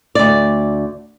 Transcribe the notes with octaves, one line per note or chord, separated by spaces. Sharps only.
D2 D5